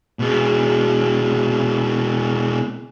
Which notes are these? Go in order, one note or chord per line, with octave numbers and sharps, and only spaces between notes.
B2 G#3